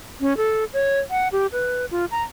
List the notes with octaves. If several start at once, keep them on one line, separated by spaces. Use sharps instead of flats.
C#4
A4
C#5
F#5
G4
B4
F4
A#5